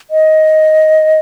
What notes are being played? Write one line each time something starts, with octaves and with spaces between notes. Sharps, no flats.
D#5